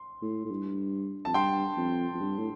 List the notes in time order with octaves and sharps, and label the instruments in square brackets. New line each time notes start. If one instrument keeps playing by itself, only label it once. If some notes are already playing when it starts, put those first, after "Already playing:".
Already playing: [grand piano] C6
[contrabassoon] A2
A2
G2
[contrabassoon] F2 [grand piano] A5
[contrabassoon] G2 [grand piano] G5 C6
[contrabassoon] F2
F2
G2
A2